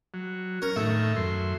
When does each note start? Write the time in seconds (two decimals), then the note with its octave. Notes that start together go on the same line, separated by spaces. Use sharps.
0.14 F#3
0.62 C#4 A#4
0.76 A2 D#3 A3 E5
1.16 F#2 C6